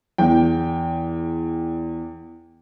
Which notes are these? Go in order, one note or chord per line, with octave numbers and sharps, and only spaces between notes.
E2 G5